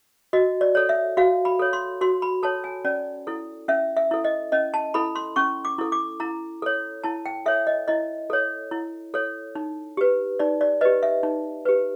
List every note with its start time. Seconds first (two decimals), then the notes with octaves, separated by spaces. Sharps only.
0.33 F#4 D#5
0.61 D5
0.75 A4 C#5
0.89 E5
1.17 F#4 F5
1.45 B5
1.59 A4 C#5
1.73 C6
2.01 F#4 C6
2.22 B5
2.43 A4 C#5 A5
2.64 G#5
2.85 C#4 D5
3.27 E4 A4
3.68 C#4 E5
3.97 E5
4.11 E4 A4
4.24 D#5
4.52 C#4 D#5
4.74 A5
4.94 E4 A4 B5
5.16 C6
5.36 C#4 C#6
5.65 D6
5.78 E4 A4
5.92 D6
6.20 E4 A#5
6.62 A4 C#5
7.04 E4 A5
7.26 G5
7.46 A4 C#5 E5
7.67 D#5
7.88 E4 D#5
8.30 A4 C#5
8.71 E4
9.14 A4 C#5
9.55 D#4
9.97 G4 B4
10.39 D#4 D5
10.61 D5
10.81 G4 B4 D#5
11.03 E5
11.23 D#4
11.65 G4 B4